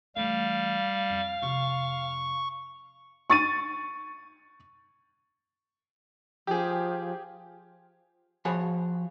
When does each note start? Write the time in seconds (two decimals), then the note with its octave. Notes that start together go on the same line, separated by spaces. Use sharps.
0.16 E3 G3 A3 F5
1.10 F2
1.42 F2 C3 C#6
3.30 C#6 A6 D#7
6.47 F3 G4 G#4
8.45 F3 F#4 G#4 C#5 B5